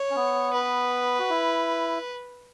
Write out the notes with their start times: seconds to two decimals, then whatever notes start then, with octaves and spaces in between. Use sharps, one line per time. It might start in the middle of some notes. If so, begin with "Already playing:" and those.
Already playing: C#5
0.11 C#4
0.16 B3
0.53 B4
1.19 F#4
1.30 E4